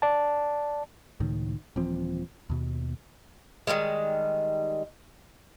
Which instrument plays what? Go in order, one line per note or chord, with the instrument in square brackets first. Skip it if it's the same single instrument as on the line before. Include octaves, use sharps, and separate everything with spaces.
[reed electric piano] D5 A5
[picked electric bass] C#2 A2 D#3
D#1 E3 F3 C4
D#2 B2
[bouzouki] D#3 F3 G3 G#3